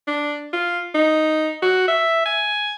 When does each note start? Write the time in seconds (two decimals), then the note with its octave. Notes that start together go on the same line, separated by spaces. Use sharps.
0.07 D4
0.53 F4
0.94 D#4
1.62 F#4
1.88 E5
2.26 G#5